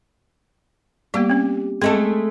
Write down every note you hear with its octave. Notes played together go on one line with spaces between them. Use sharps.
G3 A#3 B3 G4
C4 C#4
G#3 A3 C4 A4 D#5